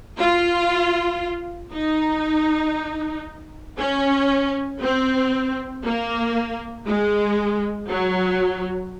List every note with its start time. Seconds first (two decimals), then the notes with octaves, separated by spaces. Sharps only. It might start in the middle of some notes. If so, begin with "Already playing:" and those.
0.18 F4
1.73 D#4
3.78 C#4
4.81 C4
5.83 A#3
6.86 G#3
7.89 F#3